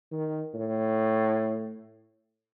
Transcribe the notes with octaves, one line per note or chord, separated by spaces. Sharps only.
D#3
A2